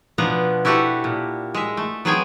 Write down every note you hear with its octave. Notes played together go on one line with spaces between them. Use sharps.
B2 F3 B3 D4 F#5 A#5
E4 F#4 G4 A4 B4
A#2
G#3 E5
A3
F#3 B3 C4 G#4 G5 G#5